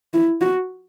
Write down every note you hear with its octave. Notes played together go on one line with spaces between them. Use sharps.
E4
F#4